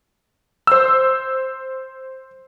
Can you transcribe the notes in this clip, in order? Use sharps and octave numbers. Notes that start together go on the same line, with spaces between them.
C5 E6